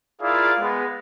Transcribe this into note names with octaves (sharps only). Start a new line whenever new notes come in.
E4 F4 G#4 A#4 D5 F5
G#3 B3